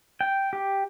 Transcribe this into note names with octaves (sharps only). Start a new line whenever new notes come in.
G5
G4